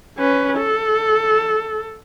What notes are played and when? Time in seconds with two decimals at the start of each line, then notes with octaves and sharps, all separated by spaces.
0.19 C#4 B4
0.57 A4